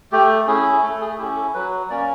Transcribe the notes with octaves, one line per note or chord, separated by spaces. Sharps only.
A3 G4
C#4 E4 G#4
A3 A4
G#4
C#4 E4 G4
A4
F#3 B4
A#3 C#4 D5